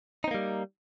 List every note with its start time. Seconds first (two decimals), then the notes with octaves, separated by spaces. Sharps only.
0.24 D#4
0.28 C4
0.31 A#3
0.34 G3